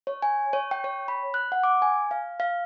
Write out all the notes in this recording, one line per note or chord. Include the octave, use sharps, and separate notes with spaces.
C#5
G#5
C#5
G5
C#5
B5
F#6
F#5
D6
G#5
F5
F5